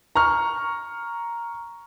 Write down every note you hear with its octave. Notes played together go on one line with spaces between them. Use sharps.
A#5 C#6 F6